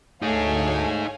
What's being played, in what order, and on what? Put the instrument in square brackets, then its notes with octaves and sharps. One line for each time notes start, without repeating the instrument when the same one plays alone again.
[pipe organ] D2 [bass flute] A3 [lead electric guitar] D#4 G#4 [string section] C#5 F5 G#5